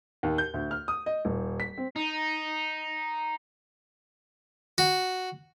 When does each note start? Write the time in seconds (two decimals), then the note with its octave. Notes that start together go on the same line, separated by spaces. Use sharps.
0.23 D#2
0.38 G6
0.54 D2
0.71 F6
0.88 D#6
1.06 D#5
1.25 D#1
1.60 B6
1.78 C4
1.96 D#4
4.78 F#4